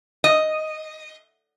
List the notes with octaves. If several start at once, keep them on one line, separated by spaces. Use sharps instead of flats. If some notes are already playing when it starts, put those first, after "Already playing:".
D#5